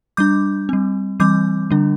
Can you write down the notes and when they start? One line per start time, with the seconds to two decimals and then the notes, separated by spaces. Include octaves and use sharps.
0.17 G3 D4 D6 G6
0.69 G3 C4
1.20 E3 G3 C4 D6 G6
1.70 D3 G3 D4